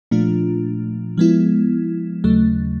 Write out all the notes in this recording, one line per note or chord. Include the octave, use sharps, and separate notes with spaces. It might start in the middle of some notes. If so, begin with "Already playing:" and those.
A#2 F3 A3 D4 F4
F3 G#3 B3 E4
D#2 C#3 F#3 A3